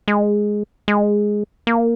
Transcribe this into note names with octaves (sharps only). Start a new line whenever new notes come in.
G#3
G#3
A#3